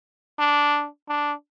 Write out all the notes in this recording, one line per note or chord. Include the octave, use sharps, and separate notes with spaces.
D4
D4